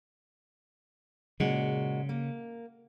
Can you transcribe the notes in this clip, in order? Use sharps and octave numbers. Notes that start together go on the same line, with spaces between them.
A#2 C#3 G#3 F#4
A#3